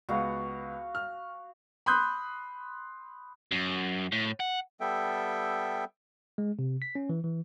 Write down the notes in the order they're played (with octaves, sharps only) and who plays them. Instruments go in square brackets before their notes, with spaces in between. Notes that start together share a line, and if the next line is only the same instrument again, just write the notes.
[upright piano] C#2 B3 [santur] F#4 F5 D#6
[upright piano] F6
B5 C6 D#6 F#6 G6
[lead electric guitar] F#2
A2
F#5
[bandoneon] G3 B3 A4 E5 G5
[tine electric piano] G#3
C3
B6
C#4
E3
E3